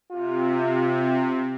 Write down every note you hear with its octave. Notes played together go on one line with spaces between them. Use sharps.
C3 F4